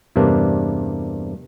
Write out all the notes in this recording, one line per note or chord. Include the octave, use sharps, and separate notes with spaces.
E2 G2 C3 A#3 D4